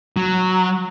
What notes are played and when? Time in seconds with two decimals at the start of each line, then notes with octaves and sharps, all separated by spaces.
0.17 F#3